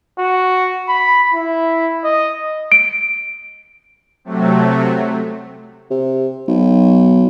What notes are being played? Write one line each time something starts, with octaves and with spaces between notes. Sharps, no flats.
F#4
B5
E4
D#5
D7
C3 F#3 A3
C3
B1